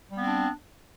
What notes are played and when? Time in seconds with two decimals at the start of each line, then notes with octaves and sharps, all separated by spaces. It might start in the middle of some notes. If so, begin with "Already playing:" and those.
0.12 G3
0.16 B3
0.21 C4
0.26 D4